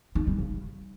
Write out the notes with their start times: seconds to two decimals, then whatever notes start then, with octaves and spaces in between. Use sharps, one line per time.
0.15 D#4
0.27 G3
0.38 C#3